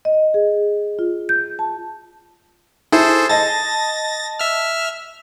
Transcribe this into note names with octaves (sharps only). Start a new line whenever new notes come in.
D#5
G#4
F4
G6
A5
E4 G#4 A4 C5
D#5 A5 A6 A#6
E5 F6